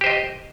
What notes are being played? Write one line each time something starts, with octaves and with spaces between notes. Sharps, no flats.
G4 C5 D#5